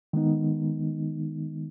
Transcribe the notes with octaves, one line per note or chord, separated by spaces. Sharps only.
D#3 G#3 B3 D#4